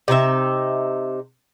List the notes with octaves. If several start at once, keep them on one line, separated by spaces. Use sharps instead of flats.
C3 D#4 F#4 E5